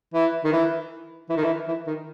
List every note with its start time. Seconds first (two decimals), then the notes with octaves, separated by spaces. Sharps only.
0.14 E3
0.45 D#3
0.53 E3
1.30 E3
1.37 D#3
1.44 E3
1.68 E3
1.87 D#3